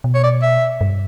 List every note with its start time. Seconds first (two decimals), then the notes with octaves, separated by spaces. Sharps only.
0.04 B2
0.15 C#5
0.23 D5
0.42 E5
0.81 G2